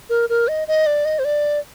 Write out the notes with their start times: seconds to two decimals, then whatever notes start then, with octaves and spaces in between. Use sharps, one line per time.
0.10 A#4
0.29 A#4
0.48 D#5
0.68 D#5
0.86 D5
1.05 D#5
1.19 C5
1.25 D5